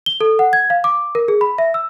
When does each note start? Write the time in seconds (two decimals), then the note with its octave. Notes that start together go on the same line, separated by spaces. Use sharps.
0.06 G7
0.21 A4
0.39 F#5
0.53 G#6
0.70 F5
0.84 D6
1.15 A#4
1.28 G#4
1.41 B5
1.58 E5
1.74 E6